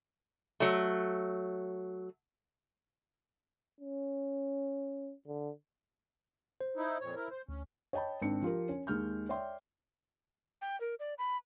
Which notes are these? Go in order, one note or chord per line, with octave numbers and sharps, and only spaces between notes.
F#3 A3
C#4
D3
C5
D#4 E4
F2 A#2 C#5
E4 A#4
C5
D2 C#4
C#5 D#5 G5 A5 B5
G#1 C4 D4 C#7
F3 F4 G4 A#4
C#4
D#2 G#3 F6 G6
C#5 D5 E5 G5 C6
G5
A#4
D5
B5